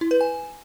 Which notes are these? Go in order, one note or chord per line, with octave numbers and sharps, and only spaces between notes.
E4
B4
G#5